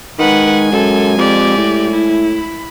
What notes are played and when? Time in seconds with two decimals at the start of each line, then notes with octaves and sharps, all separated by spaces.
0.18 D#3 G#3 B4 F#5 G#5
0.72 F#2 A4
1.18 F2 G4 D5
1.57 A2
1.91 E4
2.34 B5